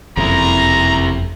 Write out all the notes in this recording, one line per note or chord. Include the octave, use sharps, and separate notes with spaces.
F#1 F2 C3 E4 A#5